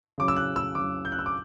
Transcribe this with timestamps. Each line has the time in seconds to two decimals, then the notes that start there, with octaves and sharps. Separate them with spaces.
0.18 C#3 F#3 D6
0.28 E6
0.36 F#6
0.56 E6
0.75 C#3 F#3 D6
1.05 G6
1.12 F#6
1.19 E6
1.26 D6